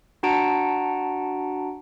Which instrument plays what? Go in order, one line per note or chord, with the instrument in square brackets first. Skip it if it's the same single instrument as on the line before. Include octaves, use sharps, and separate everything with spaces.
[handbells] D4 F#4 F#5 A5 A#5 D7